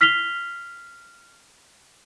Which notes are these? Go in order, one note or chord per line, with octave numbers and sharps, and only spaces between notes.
F6 B6 C7 F7 G7